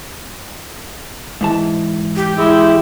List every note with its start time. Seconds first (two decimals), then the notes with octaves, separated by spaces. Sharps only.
1.41 G#2 E3 A5
2.16 G4
2.38 G#3 E4